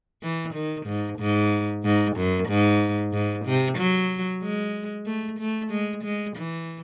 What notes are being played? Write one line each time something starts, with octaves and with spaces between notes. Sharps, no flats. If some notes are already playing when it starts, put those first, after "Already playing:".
E3
D#3
G#2
G#2
G#2
F#2
G#2
G#2
C3
F#3
G#3
A3
A3
G#3
G#3
E3